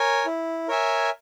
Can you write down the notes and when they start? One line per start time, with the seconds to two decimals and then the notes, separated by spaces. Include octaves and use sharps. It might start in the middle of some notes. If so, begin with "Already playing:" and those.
Already playing: A#4 C#5 G#5
0.26 E4
0.68 A#4 C#5 E5 G#5